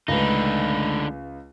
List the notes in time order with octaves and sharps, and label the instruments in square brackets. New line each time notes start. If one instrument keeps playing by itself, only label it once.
[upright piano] C#2 B4 [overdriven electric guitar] D3 D#4 [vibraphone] G#3 A3 B5